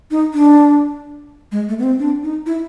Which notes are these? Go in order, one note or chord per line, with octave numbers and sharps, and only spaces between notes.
D#4
D4
G#3
A3
B3
C4
D4
D#4
E4